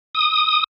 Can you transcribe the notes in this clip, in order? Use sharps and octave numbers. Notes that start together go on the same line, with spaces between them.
D#6